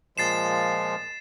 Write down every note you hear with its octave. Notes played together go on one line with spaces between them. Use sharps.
A#2 F3 G#3 A6 C7 E7